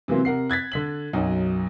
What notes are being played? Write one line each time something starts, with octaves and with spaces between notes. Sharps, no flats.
C3 E3 F#3 A#3 C4
C3 A#4 F#5 C7
F#6 G#6 A6 B6
D3 B6 F#7
B1 F#2 D#4 F#5